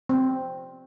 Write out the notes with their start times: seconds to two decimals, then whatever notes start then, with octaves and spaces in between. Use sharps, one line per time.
0.09 C4